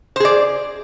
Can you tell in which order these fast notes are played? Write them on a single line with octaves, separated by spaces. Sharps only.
C5 G#4 D5